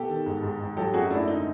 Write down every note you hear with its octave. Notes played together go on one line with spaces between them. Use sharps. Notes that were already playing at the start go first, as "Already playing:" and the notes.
Already playing: B2 G4 A4
D#3
G#2
G#2
G#2
F#3 G4 A4
F#2 F#4 G#4
A3 D4 E4
D3 D#4